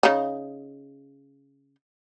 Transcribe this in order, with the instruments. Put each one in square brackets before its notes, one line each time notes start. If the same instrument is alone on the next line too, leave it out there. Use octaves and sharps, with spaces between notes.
[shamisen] C#3 D#4